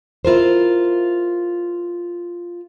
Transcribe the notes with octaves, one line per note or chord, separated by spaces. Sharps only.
E4 F4 A#4 C5